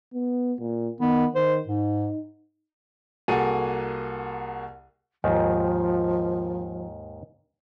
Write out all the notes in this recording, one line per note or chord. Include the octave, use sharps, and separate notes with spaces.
B3
A#2
D#3 B3
D#3 C5
G#2 D#4
C2 A#3 F#4 G#4 A4 D#7
D#2 G#2 D#3 F3